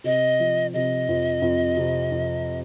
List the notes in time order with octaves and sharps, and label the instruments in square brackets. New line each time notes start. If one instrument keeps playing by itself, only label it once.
[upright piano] C3 [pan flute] D#5
[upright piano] F3
[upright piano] C3 [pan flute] D#5
[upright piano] F2
F2
C3
F2